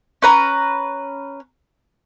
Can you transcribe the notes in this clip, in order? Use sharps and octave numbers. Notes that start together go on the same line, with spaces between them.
C#4 B4 A#5